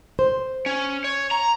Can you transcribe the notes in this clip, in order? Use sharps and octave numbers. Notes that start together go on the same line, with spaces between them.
C5
C#4
C#5
A#5